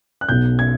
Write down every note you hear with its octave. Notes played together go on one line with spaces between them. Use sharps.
F#6
B1 B2 G6
G#6